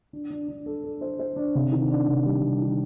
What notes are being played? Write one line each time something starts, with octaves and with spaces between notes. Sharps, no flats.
D4
D4
D4
A4
A4
C5
C5
D4
C3
D#3
D4
C3
G3
C3
D#3